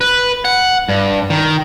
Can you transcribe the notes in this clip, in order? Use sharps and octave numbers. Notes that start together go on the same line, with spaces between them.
B4
F#5
G2
D#3